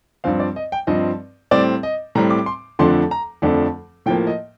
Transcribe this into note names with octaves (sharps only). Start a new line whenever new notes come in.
G2 F3 C4 F5
D5
D#5
G5
G2 F3 C4 D#5
A2 G3 C4 D5
D#5
A2 G3 C4 A#5
D6
C6
F2 D3 F3 A3 D4 C6
A#5
F2 D3 F3 A3 D4
A2 F3 A#3 G5
D#5